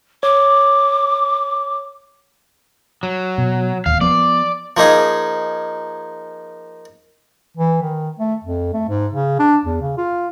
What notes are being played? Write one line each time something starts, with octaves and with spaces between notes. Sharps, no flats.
C#5 D6
F#3
B2
D1 D#2 F5
F3 B3 D5
F3 A#3 D#4 G#4
E3
D#3
A3
F2
A3
G#2
C#3
D4
E2
C#3
F4